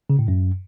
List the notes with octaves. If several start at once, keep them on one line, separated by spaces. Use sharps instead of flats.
C#3
A2
F#2